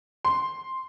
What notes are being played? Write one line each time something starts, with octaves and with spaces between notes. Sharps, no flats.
C6